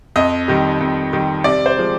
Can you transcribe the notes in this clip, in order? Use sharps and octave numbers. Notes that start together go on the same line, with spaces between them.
F2 D#5
D#3 G3
F2
D#3 G3
C3 D5
C5
F3 G#3